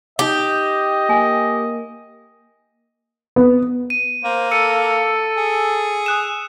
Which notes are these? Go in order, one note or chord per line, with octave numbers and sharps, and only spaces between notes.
D#4 G4 D#5 D6
A#3 G#5
B3
D#7
A#3 C5
A4 E6 C#7 D#7
G#4
D#6 F#6 E7